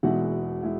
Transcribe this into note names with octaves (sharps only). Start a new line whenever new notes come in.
E1 E2 B2 G#3 E4 F#4 F#5
G#3 E4